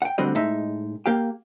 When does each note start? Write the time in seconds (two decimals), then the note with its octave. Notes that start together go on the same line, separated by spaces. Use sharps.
0.02 F#5 G5
0.18 D2 D3 G3 C4 F#4 D#5
0.35 A2 G#3 D#4 E5
1.06 A#3 G4 F5 G5